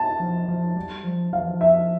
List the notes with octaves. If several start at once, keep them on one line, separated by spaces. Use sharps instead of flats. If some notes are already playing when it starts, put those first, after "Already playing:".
Already playing: A5
F3
F3
G3
F3
F3 F5
E3
F3
E5